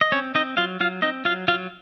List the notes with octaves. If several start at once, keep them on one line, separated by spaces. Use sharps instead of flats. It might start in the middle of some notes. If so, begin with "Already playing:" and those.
D#5
C4 C#4 C#5
C4 D#4 D#5
F#3 F4 F5
F#3 F4 F5
C4 D#4 D#5
F#3 F4 F5
F#3 F4 F5